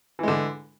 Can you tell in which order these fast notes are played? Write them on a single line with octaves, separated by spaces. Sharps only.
E3 G#3 D3